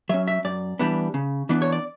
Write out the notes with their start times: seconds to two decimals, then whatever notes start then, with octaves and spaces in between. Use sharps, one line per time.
0.09 F#3 C#4 E5
0.28 E5
0.45 F#2 D5
0.79 E3 G3 B3 D4
1.14 C#3
1.49 E3 B3 D4
1.62 C#5
1.72 D5